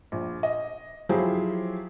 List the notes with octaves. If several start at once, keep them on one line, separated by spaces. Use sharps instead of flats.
A#1
D#5
F3 F#3 E4 G4 G#4 C5